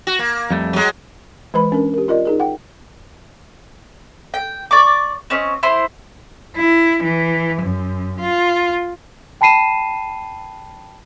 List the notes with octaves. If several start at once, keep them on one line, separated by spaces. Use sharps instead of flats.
F#4
A#3
F2 G3 A3
F#3 G#3
E3 G#3 B4 B5
C#4 D4 A#4
G4 A#4
F4 A#4 D5 D#5
D#4 G#4 A#4
F#5 G5
G5
D5 C#6 D6
C4 C#4 D#5
E4 C5 C6
E4
E3
F#2
F4
G5 A5 B5 C7 D#7 E7